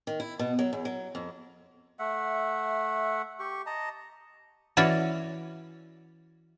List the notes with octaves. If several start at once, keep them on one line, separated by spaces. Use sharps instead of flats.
D#3
E4
B2
F#3
E2
F#3
F2
A3 E5 F#5
G4 C#6
D#5 A5 A#5
E3 C#4 F#4 C#5 D5